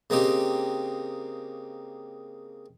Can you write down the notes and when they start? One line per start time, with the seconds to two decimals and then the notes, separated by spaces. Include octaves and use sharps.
0.10 C#3 A#3 C4 D#4 G4